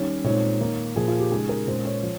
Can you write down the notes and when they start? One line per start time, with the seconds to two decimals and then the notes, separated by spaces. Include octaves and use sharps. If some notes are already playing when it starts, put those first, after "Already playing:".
Already playing: D#3 G3 C#4 C#5
0.24 A#2 G#3 C4 D#4 C#5
0.61 D#3 A#3 D#4
0.96 A#2 F3 A#3 G#4
1.08 F4
1.19 G4
1.32 C#3 G#3 D#4 G#4
1.49 A#4
1.67 A#2 G#3 C#4 C5
1.85 C#5
2.03 F3